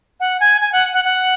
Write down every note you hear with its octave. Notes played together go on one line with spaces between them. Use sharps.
F#5
G#5
G#5
F#5
F#5
F#5